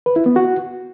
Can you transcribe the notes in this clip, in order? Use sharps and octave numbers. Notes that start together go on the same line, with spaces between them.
B4
E4
B3
F#4